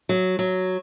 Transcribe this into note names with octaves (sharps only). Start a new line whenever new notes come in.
F#3
F#3